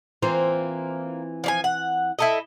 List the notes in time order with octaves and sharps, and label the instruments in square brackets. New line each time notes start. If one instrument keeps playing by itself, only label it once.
[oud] E3 C4 F4 [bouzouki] A#3
[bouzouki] F3 D5 G#5
F#5
E4 A4 D#5